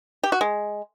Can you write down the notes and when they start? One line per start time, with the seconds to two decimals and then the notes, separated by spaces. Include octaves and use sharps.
0.23 G4
0.32 F#4
0.41 G#3